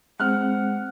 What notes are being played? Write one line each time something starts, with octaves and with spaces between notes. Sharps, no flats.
G#3 C4 F#5 F6 F#6